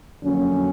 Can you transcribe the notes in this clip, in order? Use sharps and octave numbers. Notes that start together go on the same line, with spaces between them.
F2 D3 F#3 A#3 C#4